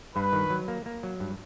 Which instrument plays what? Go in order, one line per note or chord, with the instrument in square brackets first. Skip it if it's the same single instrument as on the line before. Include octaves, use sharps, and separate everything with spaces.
[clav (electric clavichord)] G2 [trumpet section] B4
[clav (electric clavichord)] D#3
F#3
A#3
A#3
F#3
G2